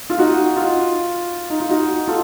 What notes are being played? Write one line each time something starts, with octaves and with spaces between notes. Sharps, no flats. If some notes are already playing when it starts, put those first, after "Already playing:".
F4
D#4 F#4
F4
D#4
F4
D#4 F#4
F4 A4